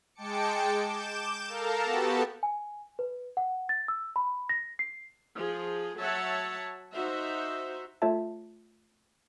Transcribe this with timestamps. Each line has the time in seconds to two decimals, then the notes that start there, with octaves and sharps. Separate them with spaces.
0.14 G#3 G5 A5 D6 C#7
0.83 D6 G6 E7
1.47 A4 A#4 F5 A5 A#5
1.84 B3 F#4 G4 A4 A5
2.43 G#5
2.99 B4
3.37 F#5
3.69 A6
3.88 E6
4.16 B5
4.49 A#6
4.79 C7
5.35 F3 G#4
6.00 F#3 C#5 E5 F#5 A5
6.93 D#4 F#4 C5 E5
8.02 A3 F4 A4 C#5 E5 A5